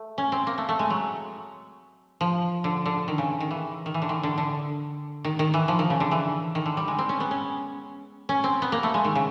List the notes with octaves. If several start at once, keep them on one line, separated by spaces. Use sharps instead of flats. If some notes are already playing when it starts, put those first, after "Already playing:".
Already playing: A3
C#4
C4
A#3
A3
A3
G#3
F#3
F3
D3
D3
D#3
C#3
D#3
E3
D#3
E3
D3
D#3
D3
D3
D#3
D#3
E3
F3
D#3
C#3
D3
E3
D#3
D3
G3
G#3
C4
C#4
B3
C#4
C#4
C4
B3
A#3
A3
G#3
D#3
C#3